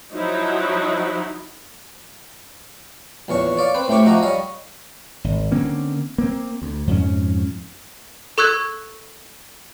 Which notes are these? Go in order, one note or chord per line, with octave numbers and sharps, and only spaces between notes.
F3 F#3 D#4 E4
A#1 E2 C#5 C#6
C#5 D5 F5
C4 B4 C5
A2 A3 C4 G4 C#6 D6
F3 D#4 F#4 E5 A#5
G3 C#5 D#5 F5
G#1
D3 A#3 C4 C#4
A#3 C4
D2
F2 G#2 C#4
A4 C#6 E6 F#6 G#6